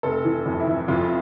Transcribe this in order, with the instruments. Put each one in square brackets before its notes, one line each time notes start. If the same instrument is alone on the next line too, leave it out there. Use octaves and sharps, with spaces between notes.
[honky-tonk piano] F1 A4
E3
F2
E4
E3
F2 F4